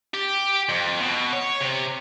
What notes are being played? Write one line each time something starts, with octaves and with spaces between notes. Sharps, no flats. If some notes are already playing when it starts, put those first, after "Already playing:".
G4
F2
B2
C#5
C3